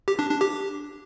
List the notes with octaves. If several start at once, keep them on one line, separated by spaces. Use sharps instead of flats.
G4
D4
D4
G4